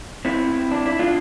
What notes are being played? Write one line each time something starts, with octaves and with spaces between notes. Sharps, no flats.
C4 E4
D4
E4
D4 F4